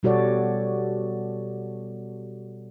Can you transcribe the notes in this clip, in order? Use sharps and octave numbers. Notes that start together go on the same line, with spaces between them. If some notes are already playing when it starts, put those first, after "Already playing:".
B2 G3 F#4 A4 C#5 D5